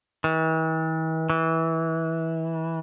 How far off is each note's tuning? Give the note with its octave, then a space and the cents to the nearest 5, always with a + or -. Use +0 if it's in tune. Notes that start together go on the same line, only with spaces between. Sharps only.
E3 -45
E3 -20